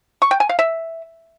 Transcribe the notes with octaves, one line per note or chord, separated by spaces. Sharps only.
C#6
G5
G#5
F5
E5